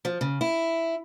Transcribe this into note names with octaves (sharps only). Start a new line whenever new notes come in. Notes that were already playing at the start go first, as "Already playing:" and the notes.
F3
C#3
E4